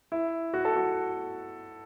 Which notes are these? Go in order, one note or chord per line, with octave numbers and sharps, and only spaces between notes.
E4
F#4
A4
F#4